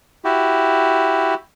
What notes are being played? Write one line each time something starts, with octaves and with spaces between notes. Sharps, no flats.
E4 F#4 G4